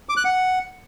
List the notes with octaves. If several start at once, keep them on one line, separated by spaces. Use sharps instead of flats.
D6
F#6
F#5